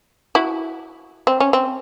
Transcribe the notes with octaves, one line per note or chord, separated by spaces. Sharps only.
E4 F#4
C4
C#4
C4